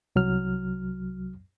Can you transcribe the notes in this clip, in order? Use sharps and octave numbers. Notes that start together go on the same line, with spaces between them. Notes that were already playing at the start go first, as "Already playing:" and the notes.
C2 F#3 F6